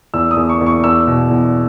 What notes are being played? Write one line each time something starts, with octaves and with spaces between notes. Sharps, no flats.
E2 E6
D#6
E2
C#6
E2
C#6
E2 E6
B2
E2